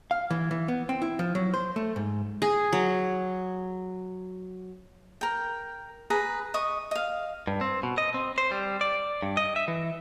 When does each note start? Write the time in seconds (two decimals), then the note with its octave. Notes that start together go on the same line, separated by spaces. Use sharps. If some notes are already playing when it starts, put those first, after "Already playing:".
0.11 F5
0.31 E3
0.51 E3
0.68 B3
0.89 C4
1.02 E4
1.19 F3
1.35 F#3
1.54 C5
1.76 A3
1.96 G#2
2.42 G#4
2.73 F#3
5.21 A#4 G5
6.10 G#4 B4 A#5
6.54 D#5 C#6 D#6
6.91 D#5 F5
7.47 G2
7.61 C4
7.83 B2
7.98 D#5
8.14 C4
8.38 C5
8.51 G3
8.81 D5
9.22 G2
9.37 D#5
9.56 E5
9.68 E3